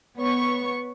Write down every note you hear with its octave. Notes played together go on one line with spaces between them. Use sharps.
B3 C#5 C#6